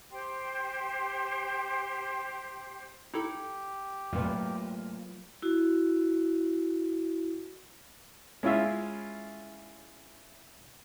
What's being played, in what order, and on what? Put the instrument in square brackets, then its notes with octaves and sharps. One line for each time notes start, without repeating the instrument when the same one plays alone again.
[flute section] G4 C5 G5 C6
[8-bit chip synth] D#4 E4 A4 [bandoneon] G4
[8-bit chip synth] F2 A#2 [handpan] F#3 B4 [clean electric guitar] A3 A#3 F4
[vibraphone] E4 F#4
[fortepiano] G#3 C#4 E4 F4 E5